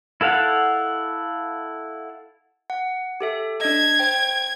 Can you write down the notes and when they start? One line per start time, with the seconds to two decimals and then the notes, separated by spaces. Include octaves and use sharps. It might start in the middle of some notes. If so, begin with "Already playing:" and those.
0.21 E4 A4 F5 F#5
2.70 F#5
3.21 G4 A4 E5
3.61 D4 D#5 G#6
3.99 C5 G5